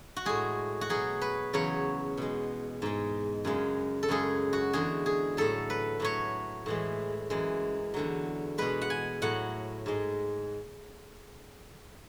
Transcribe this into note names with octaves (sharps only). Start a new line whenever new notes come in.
F#4
A2 G#3 G#4
F#4
B2 F#3 G#4
B4
E2 C#3 F#3 C#5
B2 G#3
G#2 G#3
F#2 C#3 G#3
A4
F#2 C#3 G#3 G#4
F#4
E2 D3 G#3 G#4
G#4
A2 F#3 A4
B4
A2 F#3 C#5
A2 E3 G#3
F#2 E3 G#3
E2 D3 F#3
B2 G#3 B4
F#5
G#5
A2 F#3 F#5
G#2 G#3